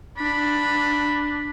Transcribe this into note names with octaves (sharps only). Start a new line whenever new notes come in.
D4 B5